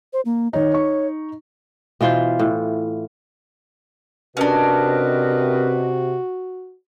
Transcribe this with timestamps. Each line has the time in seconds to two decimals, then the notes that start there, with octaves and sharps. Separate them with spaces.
0.13 C5
0.25 A#3
0.53 D#3 D#4 C#5
0.74 D#4 C#6
2.01 B2 E3 F4 C5
2.39 A2
4.37 C3 C#4 D4 F#4 A#4 B4 D#5